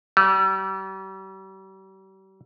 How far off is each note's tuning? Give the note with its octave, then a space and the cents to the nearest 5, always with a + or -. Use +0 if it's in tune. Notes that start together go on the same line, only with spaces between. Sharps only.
G3 -40